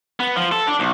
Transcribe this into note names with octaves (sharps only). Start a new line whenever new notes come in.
B3
F3
A4
D4
B1